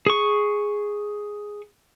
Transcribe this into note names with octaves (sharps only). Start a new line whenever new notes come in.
G#4 C#6